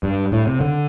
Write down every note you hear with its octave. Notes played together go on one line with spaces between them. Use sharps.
G2
A2
C3
D3